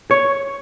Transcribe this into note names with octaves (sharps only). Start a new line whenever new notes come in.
C#5